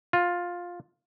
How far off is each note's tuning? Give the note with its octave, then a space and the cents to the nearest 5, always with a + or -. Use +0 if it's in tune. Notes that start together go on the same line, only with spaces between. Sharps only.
F4 +10